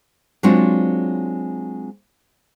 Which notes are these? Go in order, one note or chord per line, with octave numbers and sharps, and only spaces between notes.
F#3 G#3 C4 D4 F4 F#4